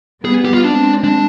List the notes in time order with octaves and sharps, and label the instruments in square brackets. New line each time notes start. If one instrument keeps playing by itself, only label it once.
[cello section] G3 B3 [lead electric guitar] G#4
[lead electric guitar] G4
F4
[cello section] G#3 C4 [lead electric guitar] D4
[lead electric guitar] D4